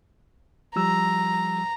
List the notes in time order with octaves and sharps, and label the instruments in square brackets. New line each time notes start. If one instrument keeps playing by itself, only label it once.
[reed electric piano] F3 G3 E6 [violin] A#5